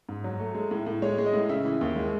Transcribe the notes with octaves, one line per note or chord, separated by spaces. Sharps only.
G#2
F#3
A3
G#3
A2
A2
G#3 C#5
G#3
D#5
A2
C#3 E5
E3
D#2
G#3